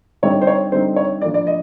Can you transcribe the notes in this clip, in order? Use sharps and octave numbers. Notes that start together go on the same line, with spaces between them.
D3 G3 C4 D#4 C#5
C5
C#5
D3 G3 C4 D#4 C5
C#5
F3 A#3 D4 D5
D5
D#5